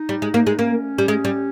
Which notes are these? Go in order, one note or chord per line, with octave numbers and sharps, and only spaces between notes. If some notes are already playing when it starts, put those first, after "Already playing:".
Already playing: D#4
G3
G#3
A#3
G#3
A#3 C#4
G3
G#3
G3